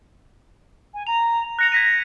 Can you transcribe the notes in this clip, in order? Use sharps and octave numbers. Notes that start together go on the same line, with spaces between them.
G#5
A#5 F7
F#6 A#6 C#7 F7
G#6 A#6 B6 D#7